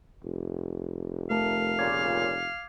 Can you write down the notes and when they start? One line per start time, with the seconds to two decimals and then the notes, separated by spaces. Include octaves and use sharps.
0.24 F1
1.31 A3 A#4 F5 A5
1.79 A#2 C#3 D6 G#6